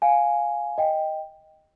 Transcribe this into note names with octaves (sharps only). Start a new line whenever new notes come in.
F5 G#5
D#5 G5